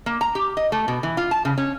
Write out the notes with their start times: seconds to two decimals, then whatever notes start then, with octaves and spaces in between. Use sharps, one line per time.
0.06 A#3
0.21 A#5
0.35 G4
0.57 D#5
0.72 A3
0.88 B2
1.03 E3
1.17 F4
1.31 A5
1.45 C#3
1.58 C#4